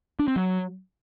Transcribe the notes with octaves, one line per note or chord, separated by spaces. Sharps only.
D4
C4
F#3